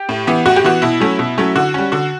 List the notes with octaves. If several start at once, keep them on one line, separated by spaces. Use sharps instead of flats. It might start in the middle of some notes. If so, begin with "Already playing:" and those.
Already playing: G4
A2
E3 B3
A2 F#4
G4
E3 B3 F#4
B2 E4
F#3 A3 C#4
B2
F#3 A3 C#4
D3 F#4
G3 C#4
D3 F#4